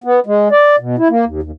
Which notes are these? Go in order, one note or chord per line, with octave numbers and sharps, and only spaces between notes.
B3
G#3
D5
B2
E4
A#3
D#2
D#2